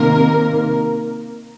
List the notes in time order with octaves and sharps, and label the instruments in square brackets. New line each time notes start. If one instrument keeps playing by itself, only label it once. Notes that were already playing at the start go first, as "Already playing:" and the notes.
Already playing: [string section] C3 D#3 A#3 A#4